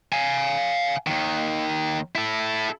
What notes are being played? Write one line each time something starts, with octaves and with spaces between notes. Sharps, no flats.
F5 G#5
D#2 D#3
E4 A4